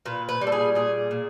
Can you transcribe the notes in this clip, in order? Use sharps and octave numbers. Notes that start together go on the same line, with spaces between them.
A#2 B4
B4
G3
A4
G#4
A#2 G#4
A#2